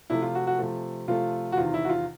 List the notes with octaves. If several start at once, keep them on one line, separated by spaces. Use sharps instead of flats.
C3 F3 A3 E4
F4
F#4
F#4
C3 F3 A3
C3 F3 A3 F4
F#4
E2 C3 D#3 F4
E4
F#4
F4